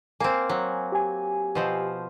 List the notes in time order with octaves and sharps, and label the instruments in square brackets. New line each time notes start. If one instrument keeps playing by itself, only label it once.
[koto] A#3 C4 [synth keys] G#5
[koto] F#3
[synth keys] G4 G#5
[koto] B2 F3 C4